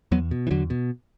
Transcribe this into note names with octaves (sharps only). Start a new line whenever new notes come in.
E2 F#3 B3
B2
E3
E2 D3 F#3
B2